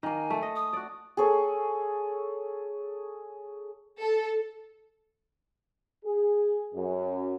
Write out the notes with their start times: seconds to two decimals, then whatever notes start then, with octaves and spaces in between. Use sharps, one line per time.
0.03 D#3 A#3 G#5
0.30 A3 A4
0.42 D#5
0.56 D#6
0.73 F#4 D5
1.17 G#4 A4 C#5
4.02 A4
6.05 G#4
6.74 F#2